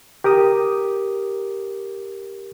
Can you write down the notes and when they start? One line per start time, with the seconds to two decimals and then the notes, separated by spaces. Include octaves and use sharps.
0.24 G4 A#4 D6 D#6